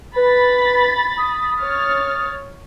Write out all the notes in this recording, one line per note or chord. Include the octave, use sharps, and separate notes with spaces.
B4 B5 A6
D#6
C#5 F6 A6